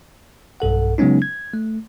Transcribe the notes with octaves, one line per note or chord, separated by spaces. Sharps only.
B1 G2 A4 F#5
C#3 F#3 G#3 B3 C#4 D#4
G#6
A3